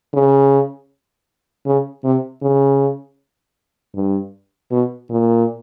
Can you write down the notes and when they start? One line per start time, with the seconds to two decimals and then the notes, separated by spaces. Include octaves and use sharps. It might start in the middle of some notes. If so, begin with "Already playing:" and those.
0.13 C#3
1.66 C#3
2.04 C3
2.42 C#3
3.95 G2
4.71 B2
5.10 A#2